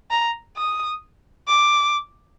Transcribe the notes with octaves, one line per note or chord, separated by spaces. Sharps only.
A#5
D#6
D6